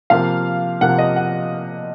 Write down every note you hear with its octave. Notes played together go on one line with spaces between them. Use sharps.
C3 F3 A#3 F5
C3 F3 A#3 F#5
D#5
F#5